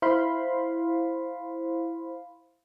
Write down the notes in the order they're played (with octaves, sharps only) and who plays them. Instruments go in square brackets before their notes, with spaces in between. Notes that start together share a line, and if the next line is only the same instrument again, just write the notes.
[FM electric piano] E4 C5 F5 B5 C6